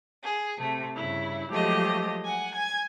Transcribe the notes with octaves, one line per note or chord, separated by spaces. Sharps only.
G#4
C3 A3
G2 C#3 E4
F3 F#3 G#3 A3 G4 D#5
F#5 G#5
G#5 G#6